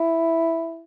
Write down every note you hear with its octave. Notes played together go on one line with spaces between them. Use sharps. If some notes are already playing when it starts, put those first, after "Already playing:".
Already playing: E4